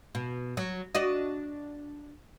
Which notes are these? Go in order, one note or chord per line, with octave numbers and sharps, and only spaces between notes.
B2
F#3
D4 F#4 D#5